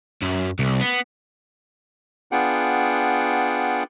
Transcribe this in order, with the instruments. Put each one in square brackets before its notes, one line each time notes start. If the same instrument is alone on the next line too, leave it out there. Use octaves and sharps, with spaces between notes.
[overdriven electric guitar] F#2
C2
B3
[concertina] B3 D4 F4 G#4 F#5 G5